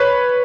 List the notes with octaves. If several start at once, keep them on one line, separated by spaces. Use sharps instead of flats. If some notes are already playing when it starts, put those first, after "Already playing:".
Already playing: B4 C#5